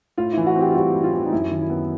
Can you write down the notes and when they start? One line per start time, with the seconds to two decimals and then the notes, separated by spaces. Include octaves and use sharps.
0.18 A2 F4
0.33 E3 E4
0.46 F#4
0.56 C4 G4
0.71 F4
0.75 G3 F#4
0.94 A2
1.04 F4
1.13 E3
1.25 D#4
1.33 F#2 E4
1.51 D#3
1.61 E4
1.70 B3